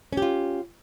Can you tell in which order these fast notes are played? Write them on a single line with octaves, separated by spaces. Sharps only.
C#4 G4 F4